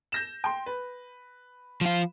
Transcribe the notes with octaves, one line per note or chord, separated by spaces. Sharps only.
G6 A#6 E7
G5 C6
B4
F3 F4